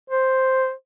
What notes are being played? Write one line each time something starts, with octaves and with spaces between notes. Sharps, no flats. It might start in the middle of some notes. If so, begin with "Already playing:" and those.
C5